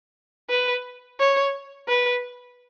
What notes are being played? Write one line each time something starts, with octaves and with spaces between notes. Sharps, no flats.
B4
C#5
B4